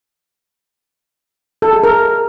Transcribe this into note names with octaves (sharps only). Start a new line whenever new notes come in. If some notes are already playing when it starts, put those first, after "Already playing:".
A4
G#4
A#4